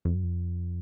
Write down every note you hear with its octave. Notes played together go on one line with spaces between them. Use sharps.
F2
F#2
F2